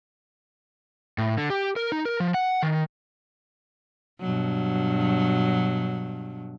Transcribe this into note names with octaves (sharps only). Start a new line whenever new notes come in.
A2
D3
G4
A#4
D#4
A#4
F3
F#5
D#3
G2 B2 F#3